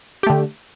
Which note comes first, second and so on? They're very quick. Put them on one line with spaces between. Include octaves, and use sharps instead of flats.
G4 A3 D3